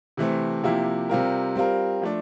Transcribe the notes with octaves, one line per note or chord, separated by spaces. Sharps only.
C3 E3 A3 C4
C3 F3 A#3 E4 G4
C3 G3 C4 F4 A#4
G3 C4 F4 A#4
F3 A3 D4